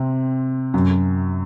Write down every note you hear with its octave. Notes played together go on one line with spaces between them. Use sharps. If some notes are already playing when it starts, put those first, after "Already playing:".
Already playing: C3 C4
F#2 F#3